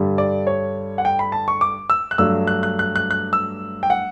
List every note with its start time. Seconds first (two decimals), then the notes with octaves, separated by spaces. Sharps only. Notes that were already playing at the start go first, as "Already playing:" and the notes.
Already playing: G2 D3 G3
0.18 D5
0.47 C#5
0.98 F#5
1.05 G5
1.19 B5
1.32 A5
1.48 C#6
1.61 D6
1.90 E6
2.11 F#6
2.18 G2 F#3 A3 D4 E6
2.47 F#6
2.63 F#6
2.79 F#6
2.96 F#6
3.11 F#6
3.33 E6
3.83 G5
3.90 F#5